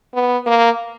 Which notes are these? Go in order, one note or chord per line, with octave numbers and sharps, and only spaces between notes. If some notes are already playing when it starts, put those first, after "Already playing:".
B3
A#3